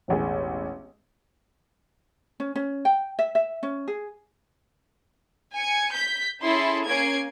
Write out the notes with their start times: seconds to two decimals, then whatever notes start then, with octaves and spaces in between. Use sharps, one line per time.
0.08 E1 A1 G#4
2.40 C#4
2.56 C#4
2.85 G5
3.19 E5
3.35 E5
3.63 C#4
3.88 G#4
5.55 G#5 C#7
5.94 G6 B6
6.42 C#4 E4 G#4 A4 C6
6.86 A#3 C#4 G#6 C7 D7